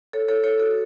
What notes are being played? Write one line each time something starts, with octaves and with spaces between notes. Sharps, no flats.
A4 C#5
A4 C#5
A4 C#5
F#4 A4